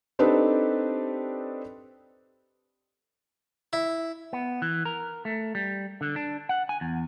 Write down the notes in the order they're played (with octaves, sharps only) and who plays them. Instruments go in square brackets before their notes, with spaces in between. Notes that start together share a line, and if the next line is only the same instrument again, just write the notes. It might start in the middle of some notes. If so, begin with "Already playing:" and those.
[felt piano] C4 D4 D#4 G4 A4 B4
[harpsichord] E4
[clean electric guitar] B3
E3
A#4
A3
G3
D3
D4
F#5
G#5
E2